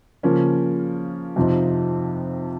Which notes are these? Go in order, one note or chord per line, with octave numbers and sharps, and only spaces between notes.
C#3 F3 A#3 C#4
F2 C3 F3 C4 D#4